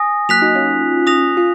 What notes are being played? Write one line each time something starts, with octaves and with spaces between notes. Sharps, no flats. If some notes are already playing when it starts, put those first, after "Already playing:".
Already playing: G#5 D#6 A#6
F#3 A#3 F#6 B6 F7
D#4 F#4
C#4 F4
D#6 A#6 F7
F4